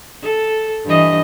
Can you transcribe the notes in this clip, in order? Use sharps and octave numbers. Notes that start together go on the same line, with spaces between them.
A4
G2 E3 D#5